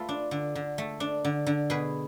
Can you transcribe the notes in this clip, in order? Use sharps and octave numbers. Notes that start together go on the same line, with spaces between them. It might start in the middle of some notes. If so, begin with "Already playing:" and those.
Already playing: A3 F4 A4 B4
D4
D3
D3
A3
D4
D3
D3
B2 G#4 B4